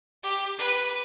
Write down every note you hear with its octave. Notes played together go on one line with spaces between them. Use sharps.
G4
B4